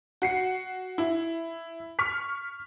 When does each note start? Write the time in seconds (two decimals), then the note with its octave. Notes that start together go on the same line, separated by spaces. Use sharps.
0.22 F#4 C7 C#7
0.98 E4
1.99 C#6 F6 B6